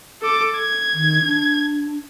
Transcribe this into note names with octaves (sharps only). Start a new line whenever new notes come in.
A4 D6
G#6
D#3
D4